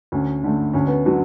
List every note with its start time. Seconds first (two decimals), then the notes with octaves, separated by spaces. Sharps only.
0.12 D2 C#4
0.44 D3 A3
0.73 D2 C#4
0.87 B3
1.05 D3 F#3